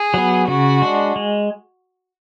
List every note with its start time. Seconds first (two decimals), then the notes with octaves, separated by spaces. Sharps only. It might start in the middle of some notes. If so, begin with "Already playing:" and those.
Already playing: G#4
0.14 F#3 B3
0.48 C#3 F#4
0.82 G#3 D4
1.16 G#3